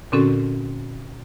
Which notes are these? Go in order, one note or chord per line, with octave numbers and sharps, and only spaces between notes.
A#2 D3 C4 C#4 F#4 A4